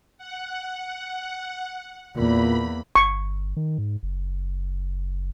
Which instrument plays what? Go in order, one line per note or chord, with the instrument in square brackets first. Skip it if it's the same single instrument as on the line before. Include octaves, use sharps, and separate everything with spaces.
[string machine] F#5
[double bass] E2 A#3 [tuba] A#2 [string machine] B5
[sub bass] G1 [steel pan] C#6
[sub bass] D#3
G#2
F#1